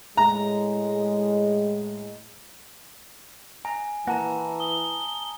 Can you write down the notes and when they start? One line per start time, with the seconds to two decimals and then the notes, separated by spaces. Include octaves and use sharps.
0.17 A2 G#3 A#5
3.65 G#5 A#5
4.07 E3 A#3 F#5 A5 A#5 A#6
4.60 D#6 G7